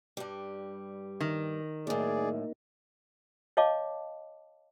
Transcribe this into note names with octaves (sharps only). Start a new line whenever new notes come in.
G2 G3
D#3
F#2 A2 A#3 D#4 G#4 D5
C#5 D#5 F5 A5 D6